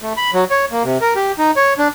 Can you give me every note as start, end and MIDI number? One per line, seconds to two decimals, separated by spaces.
0.02 0.13 57
0.17 0.31 83
0.33 0.44 54
0.50 0.65 73
0.71 0.83 58
0.84 0.98 48
1.01 1.14 70
1.15 1.32 67
1.38 1.51 63
1.56 1.74 73
1.78 1.88 62